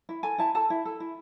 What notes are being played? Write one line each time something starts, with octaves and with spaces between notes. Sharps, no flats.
E4
A4 G#5
E4 A5
A4 A5
E4
A4
E4